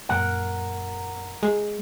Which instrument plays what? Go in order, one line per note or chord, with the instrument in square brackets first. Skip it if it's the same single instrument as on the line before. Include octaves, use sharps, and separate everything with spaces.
[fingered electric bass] F#2 A#2 [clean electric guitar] A#4 F#5
[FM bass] G#3